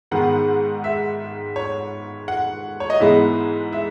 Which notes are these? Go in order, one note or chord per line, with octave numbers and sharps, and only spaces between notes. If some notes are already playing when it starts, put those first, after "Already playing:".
G#2 D#3 G#3 B3 F#5
E5
C#5
F#5
C#5
D#5
G#2 E3 G#3 B3 E5
E5